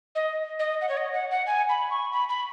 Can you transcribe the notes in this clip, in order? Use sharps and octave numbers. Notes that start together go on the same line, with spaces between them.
D#5
D#5
F#5
C#5
D#5
F#5
F#5
G#5
B5
C#6
B5
B5